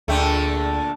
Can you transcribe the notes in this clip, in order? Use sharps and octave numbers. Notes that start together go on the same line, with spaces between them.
D2 A#2 D3 A3 G#4 G5